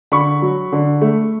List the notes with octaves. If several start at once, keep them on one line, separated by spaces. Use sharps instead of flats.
D3 B5 C#6
F#3
D3
A3